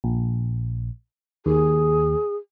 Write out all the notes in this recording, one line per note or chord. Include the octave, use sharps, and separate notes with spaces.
A#1
D#2 G#4